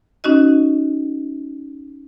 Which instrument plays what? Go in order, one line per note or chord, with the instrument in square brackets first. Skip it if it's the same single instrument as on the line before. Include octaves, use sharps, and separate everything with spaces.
[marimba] C#4 D#4 F#4 D#5